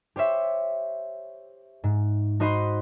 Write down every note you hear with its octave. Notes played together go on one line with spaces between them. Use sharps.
G4 C5 C#5 E5
G#2
D#4 F#4 C5 D#5 B5 C6